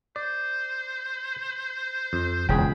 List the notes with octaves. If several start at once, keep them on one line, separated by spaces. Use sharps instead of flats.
C5 D5
F2
E1 C#2 G#4 G5 B5